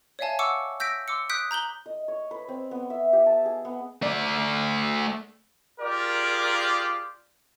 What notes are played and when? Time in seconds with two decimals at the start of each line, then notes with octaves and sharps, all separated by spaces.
0.19 C#5 D5 E5 F5 G#5 A5
0.39 F#5 C#6 D6 E6 C#7
0.80 E6 G6 A#6 B6 D7
1.08 C6 D6 E6 C#7
1.30 D#6 F#6 G6 B6 D7
1.51 A#5 G6 F#7 G7
1.86 D#5
2.08 C#5
2.31 B4
2.49 C4
2.71 B3
2.90 E5
3.13 G4
3.26 A5
3.46 G#4
3.65 B3
4.02 A3 D5
5.81 F4 G4 G#4 A#4 D5